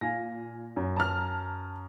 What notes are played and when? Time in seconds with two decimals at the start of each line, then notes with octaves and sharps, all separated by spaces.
0.01 A#2 F5 G#5 A#6
0.76 F#2
0.96 A5 A#5 F6